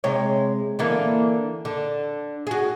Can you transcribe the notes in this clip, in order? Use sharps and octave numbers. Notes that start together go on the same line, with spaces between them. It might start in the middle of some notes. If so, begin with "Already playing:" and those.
C3 G#3 C#5
D3 E3 A#3
D3
F#4 G#4